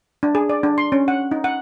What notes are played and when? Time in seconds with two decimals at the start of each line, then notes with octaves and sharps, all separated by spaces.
0.23 D4
0.35 G#4
0.49 D5
0.63 D4
0.78 C6
0.92 C#4
1.08 F#5
1.31 D#4
1.44 F#5